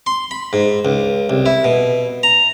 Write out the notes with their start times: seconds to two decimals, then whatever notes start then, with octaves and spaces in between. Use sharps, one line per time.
0.07 C6
0.31 B5
0.53 G#2
0.85 C#2
1.30 C2
1.46 E4
1.64 B2
2.23 A#5